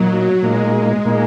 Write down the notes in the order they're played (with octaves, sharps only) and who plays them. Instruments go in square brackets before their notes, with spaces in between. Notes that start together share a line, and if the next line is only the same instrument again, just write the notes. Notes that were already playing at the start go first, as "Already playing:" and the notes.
Already playing: [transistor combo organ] A#2 A#3 D#4 [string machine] F#3
[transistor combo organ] A#2 A#3 D#4 [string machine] G#3
[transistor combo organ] A#2 A#3 D#4